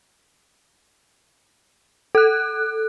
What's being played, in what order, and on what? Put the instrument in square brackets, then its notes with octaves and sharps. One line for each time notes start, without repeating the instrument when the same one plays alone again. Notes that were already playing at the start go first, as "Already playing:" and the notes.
[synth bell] A4 F#6